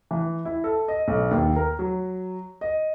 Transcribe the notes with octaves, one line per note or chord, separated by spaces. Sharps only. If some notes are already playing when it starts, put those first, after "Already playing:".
E3
E4
A4
D#5
B1
D#2
A#4
F#3
D#5